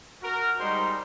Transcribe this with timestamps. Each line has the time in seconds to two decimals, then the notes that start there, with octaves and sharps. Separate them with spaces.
0.21 F#4 A#4
0.58 G3 G#3 D#4 C5 C6